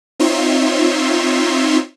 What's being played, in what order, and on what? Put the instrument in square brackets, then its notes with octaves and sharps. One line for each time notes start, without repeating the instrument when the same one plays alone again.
[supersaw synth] C4 D#4 F4 C#5 E5 C6